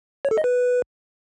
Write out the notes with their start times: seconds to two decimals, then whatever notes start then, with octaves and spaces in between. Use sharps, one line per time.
0.25 C#5
0.31 A4
0.38 D#5
0.44 B4